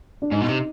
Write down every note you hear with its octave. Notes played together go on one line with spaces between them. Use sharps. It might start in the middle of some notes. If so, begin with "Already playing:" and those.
D4
G#2 D#4
B2
C3